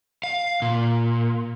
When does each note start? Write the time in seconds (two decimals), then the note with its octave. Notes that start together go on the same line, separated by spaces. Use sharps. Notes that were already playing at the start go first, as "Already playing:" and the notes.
0.24 F5
0.62 A#2